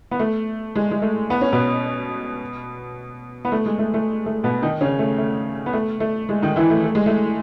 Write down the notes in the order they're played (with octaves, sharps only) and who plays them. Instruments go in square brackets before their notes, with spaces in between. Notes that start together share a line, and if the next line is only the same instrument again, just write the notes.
[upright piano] B3
A3
G#3
G#3
A3
B3
C#4
B2 B3
B3
A3
G#3
A3
A3
A3
B2 B3
D#3 D#4
C#3 C#4
A3
A3
B3
A3
A3
G#3
D#3 D#4
E3 E4
A3
A3
G#3
A3